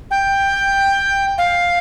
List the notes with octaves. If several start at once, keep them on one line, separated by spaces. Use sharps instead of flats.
G5
F5